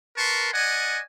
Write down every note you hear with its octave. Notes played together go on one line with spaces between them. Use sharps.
A#4 B4 A5 C6 C#6
D5 D#5 F#5 G#5